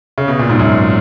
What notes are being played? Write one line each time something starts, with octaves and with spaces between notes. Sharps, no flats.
C#3
B2
A#2
G#2
F#2